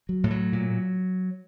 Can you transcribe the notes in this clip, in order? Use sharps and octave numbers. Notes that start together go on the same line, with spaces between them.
F#3
A2
F#3
A#2